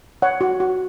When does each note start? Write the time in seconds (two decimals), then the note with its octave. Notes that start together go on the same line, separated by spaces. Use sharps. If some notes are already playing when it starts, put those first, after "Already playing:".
0.22 C#5 F#5
0.41 F#4
0.60 F#4